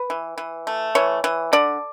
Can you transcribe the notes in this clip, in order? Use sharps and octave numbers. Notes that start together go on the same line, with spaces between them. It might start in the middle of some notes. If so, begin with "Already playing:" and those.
Already playing: B4
E3
E3
A3
E3 C#5
E3
D3 D5